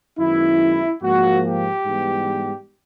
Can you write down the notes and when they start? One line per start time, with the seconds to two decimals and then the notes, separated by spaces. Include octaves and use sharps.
0.18 F#2 D#3 G#3 B3 E4
1.02 G#2 F3 A#3 F#4
1.44 G4
1.86 G#2 E3 G3 B3